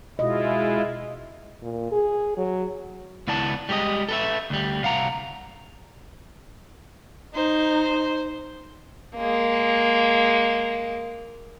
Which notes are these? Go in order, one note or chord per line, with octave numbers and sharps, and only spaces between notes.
B2 G#3 E4 F4 D#5
A#2
G#4
F#3
C#2 B3 E4 D5 A5
G3 G#3 G4 C#5 D#5
A4 B4 E5
D2 G3
C2 F5 F#5 A#5
D#4 C5
G#3 A#3